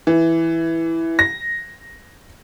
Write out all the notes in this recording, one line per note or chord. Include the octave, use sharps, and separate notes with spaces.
E3
A#6